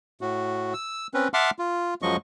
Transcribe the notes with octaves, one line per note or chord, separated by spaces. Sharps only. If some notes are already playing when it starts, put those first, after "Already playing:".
A2 F#4
E6
C4 C#4 B4
E5 F#5 A5 C6 D6 F6
F4
F#2 F3 F#3 G#3 D#5 C#6